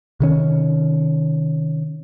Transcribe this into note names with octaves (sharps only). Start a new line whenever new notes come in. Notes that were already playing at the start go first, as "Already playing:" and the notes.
C3 D#3 C#4